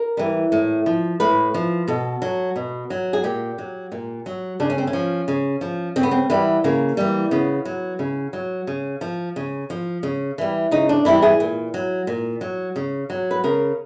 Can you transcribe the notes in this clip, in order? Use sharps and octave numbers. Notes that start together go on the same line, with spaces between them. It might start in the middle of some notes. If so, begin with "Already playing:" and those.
Already playing: A#4
E3 G3
A2
F3
A2 B4
F3
B2 A4
F#3
B2
F#3
G#4
A#2 G4
F#3
A#2
F#3
C#3 D4
C#4
C4
C#4
F3
C#3
F3
C#3 C4
B3
C4
E3 G3 B3
C#3 A#3
E3 G3
C#3 B3
F#3
C#3
F#3
C#3
F3
C#3
F3
C#3
E3 G3
C#3 D#4
D4
E3 G3 E4
G#4
A#2
F#3
A#2
F#3
C#3
F#3
B4
C#3 A#4